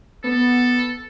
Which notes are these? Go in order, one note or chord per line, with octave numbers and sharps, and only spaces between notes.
B3 A4